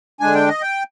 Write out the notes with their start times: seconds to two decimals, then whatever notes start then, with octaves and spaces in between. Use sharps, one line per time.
0.20 D3 G#3 D4 G#5
0.35 G5
0.48 D#5
0.62 G5